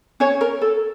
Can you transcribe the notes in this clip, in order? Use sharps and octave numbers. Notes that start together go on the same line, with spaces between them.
C#4 C#5
A#4
A4